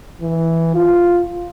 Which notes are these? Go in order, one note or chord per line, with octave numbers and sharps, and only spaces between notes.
E3
F4